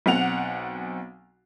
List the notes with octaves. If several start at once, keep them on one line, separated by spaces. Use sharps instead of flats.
B1 C4 F#5 F7